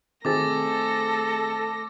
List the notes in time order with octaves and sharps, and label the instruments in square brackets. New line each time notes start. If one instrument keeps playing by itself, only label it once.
[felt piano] D#3 C4 G#4 [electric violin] A3 A#6 [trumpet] A4 [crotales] D6 A6